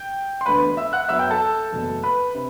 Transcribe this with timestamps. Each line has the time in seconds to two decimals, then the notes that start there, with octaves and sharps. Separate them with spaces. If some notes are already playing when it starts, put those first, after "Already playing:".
Already playing: G5 G6
0.41 C6
0.46 E1 D2 D3 B4 B5
0.77 E5 E6
0.93 F#5 F#6
1.08 F#2 F#3 B3 E5 E6
1.19 G5 G6
1.31 A4 A5
1.72 F#1 E2 B2 A3
2.03 B4 B5
2.35 C3